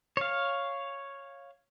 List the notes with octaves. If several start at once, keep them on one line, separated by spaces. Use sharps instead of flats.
C#5 F5